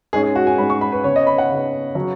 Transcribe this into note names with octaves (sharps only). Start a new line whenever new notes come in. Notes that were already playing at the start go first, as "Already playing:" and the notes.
G#2 G#3 C#4 G#4
G#4
F#4
G#5
G#2 G#3 C#4 B5
C#6
B5
B4
C#3 B3 C#5
D#5
B5
F#5
C#3 B3
C#3 F#3 C#4